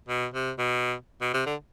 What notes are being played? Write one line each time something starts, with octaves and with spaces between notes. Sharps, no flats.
B2
C3
B2
B2
C3
D3